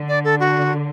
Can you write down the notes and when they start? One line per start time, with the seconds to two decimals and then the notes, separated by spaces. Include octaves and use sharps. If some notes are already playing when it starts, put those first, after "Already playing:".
Already playing: D3
0.09 D5
0.24 A4
0.40 F#4